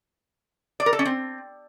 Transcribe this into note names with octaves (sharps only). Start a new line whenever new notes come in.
D5
A#4
A4
C#4
C4